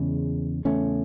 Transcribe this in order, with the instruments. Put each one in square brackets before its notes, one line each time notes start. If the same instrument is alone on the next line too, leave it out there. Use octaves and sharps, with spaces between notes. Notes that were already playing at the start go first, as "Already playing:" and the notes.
Already playing: [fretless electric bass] E2 C#3 G#3
E2 C#3 A3 C#4